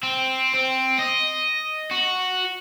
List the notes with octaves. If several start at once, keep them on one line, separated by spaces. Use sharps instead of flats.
C4
C4
D#5
F#4